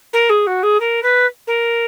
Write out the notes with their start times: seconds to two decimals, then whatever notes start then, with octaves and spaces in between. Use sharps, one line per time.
0.13 A#4
0.30 G#4
0.47 F#4
0.63 G#4
0.80 A#4
1.03 B4
1.47 A#4